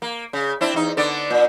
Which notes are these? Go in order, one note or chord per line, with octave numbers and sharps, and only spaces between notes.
A#3
C#3
C4 D4 E4
E2 D#4
D3 B3 D5
A#2